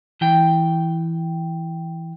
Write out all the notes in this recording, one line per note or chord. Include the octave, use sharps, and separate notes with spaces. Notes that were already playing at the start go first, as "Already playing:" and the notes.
E3 G5